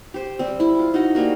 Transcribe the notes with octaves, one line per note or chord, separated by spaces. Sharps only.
G4 C5
G3 C4
E4
F4
D#4 F#4 D#5
G3 A3 A#3 F#4